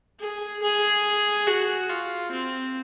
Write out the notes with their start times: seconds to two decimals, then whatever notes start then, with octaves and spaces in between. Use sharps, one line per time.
0.19 G#4
0.62 G#4
1.47 F#4
1.90 F4
2.31 C4